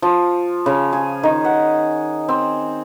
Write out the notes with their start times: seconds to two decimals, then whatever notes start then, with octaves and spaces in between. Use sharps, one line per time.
0.02 F3
0.66 C#3
0.93 G#4
1.23 D#3
1.45 F#5
2.29 C4